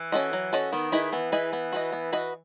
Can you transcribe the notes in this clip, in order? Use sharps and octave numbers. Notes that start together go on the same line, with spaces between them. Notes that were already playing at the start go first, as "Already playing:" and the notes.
Already playing: E3
C#4 F#4 A4 D#5
F#3
C#4 F#4 A4 D#5
D#3 B3
E4 G#4 B4 D#5
E3 B3
E4 G#4 B4 D#5
B3
F#4 B4 D#5
B3
F#4 B4 D#5